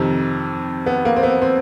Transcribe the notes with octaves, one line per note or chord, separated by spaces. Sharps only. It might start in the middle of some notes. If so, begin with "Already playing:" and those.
Already playing: F2 C3 D#3 C4
B3
A#3
C4
B3
C4